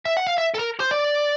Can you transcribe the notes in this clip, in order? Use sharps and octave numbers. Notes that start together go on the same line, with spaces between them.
E5
F#5
F5
E5
A4
A#4
C5
D5